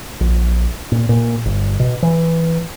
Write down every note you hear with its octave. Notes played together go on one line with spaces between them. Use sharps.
A#1
A#2
A#2
G1
B2
E3